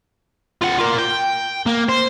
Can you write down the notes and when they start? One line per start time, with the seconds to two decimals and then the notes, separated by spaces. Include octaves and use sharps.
0.62 F4 F#5
0.79 F4 A#4
0.99 G5
1.66 A#3
1.89 C5